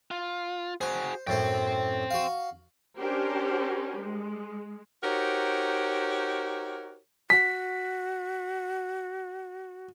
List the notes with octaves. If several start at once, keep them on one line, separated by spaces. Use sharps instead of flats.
F4
F#4 G#4 C5
F#2 A2 C4 C5 G5
F#4 F5
C#4 D4 G4 A#4 C5
G#3
D#4 F#4 G4 A#4 C5 C#5
F#4 B6